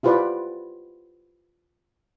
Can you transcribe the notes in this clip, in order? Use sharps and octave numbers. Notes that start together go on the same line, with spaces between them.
E4 F4 G4 B4 C5 D5